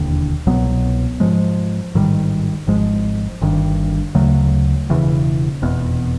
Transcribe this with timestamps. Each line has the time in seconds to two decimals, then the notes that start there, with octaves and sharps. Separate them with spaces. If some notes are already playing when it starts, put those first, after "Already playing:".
Already playing: E1 D#2 D3
0.47 C2 B2 F#3 B3
1.20 G#2 F3 G#3
1.95 A1 G#2 D#3 G3
2.67 G#1 G#2 F3 G#3
3.42 G1 G2 D#3
4.15 D2 C#3 F#3 A3
4.89 E1 E2 C#3 E3
5.62 F1 E2 B2